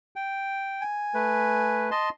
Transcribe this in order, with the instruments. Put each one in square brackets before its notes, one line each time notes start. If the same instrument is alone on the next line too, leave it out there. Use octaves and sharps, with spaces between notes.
[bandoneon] G5
[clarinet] G#5
[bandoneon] A3 B4
D#5 A5 C6